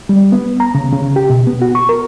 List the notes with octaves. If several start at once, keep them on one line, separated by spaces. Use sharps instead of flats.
G3
B3
A#5
C#3
C#3
G4
B2
B3
F#4
C#6
A#4